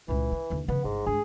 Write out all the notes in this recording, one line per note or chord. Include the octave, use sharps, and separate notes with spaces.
C#2 A#2 E3
E4
D#2 D3
C#3 F3 B3
G1 G#2
G2 G#3 G#4